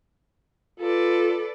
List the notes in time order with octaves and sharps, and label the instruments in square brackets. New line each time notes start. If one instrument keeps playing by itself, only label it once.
[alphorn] F4 [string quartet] A4 B4 D5